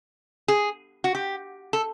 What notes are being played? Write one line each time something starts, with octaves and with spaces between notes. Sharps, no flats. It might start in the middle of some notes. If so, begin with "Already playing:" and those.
G#4
F#4
G4
A4